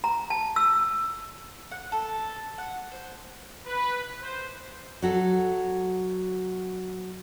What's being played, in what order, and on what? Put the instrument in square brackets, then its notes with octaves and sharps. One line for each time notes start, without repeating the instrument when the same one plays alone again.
[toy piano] A#5
A5
E6
[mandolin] F#5
A4
F#5
C5
[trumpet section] B4
C5
[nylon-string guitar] F#3 F#4 A4